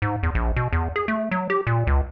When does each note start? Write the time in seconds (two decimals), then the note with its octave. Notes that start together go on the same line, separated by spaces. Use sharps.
0.02 G#2
0.23 E2
0.35 A#1
0.56 B2
0.73 E2
0.96 G#4
1.08 A3
1.31 F#3
1.50 G4
1.67 A#2
1.87 C#2